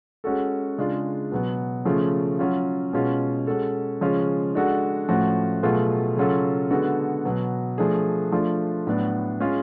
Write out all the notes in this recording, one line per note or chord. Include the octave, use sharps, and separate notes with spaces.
G#3 C#4 F#4 A4
C#3 G#3 D4 F4
B2 F#3 B3
C#3 F3 A3 C#4 F4
F#3 C#4 F4
B2 G#3 C#4 F4
G#3 C#4 F#4 A4
C#3 F3 G#3 C#4 F4
G#3 D4 F#4 A4
A2 F3 A3 C#4 F#4
B2 F#3 A3 F4 G#4
C#3 F#3 C#4 F4 A4
D3 G#3 B3 F#4 A4
B2 F#3 B3
F3 A3 D4 G#4
F3 A3 D4 F4
A2 F#3 B3 D4
G#3 C#4 F4 G#4